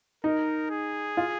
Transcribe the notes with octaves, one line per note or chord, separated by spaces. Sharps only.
D#4 A#4
G#4
F4